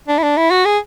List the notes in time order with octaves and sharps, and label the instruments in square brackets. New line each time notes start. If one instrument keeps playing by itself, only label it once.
[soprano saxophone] D4
E4
D4
E4
F#4
G#4